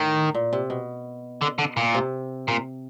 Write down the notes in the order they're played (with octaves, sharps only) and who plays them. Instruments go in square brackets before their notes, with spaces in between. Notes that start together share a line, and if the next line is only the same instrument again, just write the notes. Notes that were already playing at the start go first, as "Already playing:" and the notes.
Already playing: [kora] A2 [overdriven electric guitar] D#3
[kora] A#2
C3
B2
[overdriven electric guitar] D3
D3
A#2
[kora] C3
[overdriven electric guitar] A#2